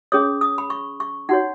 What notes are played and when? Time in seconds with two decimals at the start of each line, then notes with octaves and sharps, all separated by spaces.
0.12 C#4 G#4 C#5 D#6
0.41 D#6
0.58 B5
0.70 C#6
1.00 C#6
1.29 D#4 F#4 C#5 F#5